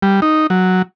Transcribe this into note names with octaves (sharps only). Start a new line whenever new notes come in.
G3
D#4
F#3